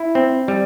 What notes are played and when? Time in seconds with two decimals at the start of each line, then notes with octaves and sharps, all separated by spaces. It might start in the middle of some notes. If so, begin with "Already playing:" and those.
Already playing: E4
0.15 C4
0.48 G3